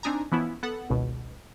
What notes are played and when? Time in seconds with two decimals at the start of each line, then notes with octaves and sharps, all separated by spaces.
0.03 C4 D4 D#4 G#5 A#5
0.32 E3 F3 B3 C#4 E4
0.63 B3 A4 F#5
0.90 G#1 C#2 B2